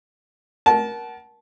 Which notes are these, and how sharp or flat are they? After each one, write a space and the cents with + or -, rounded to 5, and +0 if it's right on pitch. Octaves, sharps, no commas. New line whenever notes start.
A#4 +25 F#5 +25 A5 -20